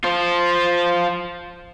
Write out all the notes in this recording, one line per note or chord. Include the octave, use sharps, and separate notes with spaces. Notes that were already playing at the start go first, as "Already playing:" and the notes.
F4 C5